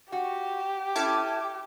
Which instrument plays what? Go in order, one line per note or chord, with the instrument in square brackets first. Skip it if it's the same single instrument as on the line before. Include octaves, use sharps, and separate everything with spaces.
[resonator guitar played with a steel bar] F#4 [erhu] G4
[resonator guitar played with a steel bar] C#4 E4 A4 [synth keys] A5 D6 G#6